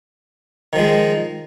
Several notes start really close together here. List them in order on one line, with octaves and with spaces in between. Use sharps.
D#3 F3 G#3